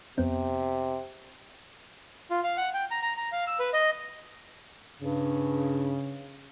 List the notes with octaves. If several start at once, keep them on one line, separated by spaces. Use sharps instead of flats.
F2 C3 B3 C4
F4
F5
F#5
G5
A#5
A#5
A#5
F5
E6
B4
D#5
G2 C#3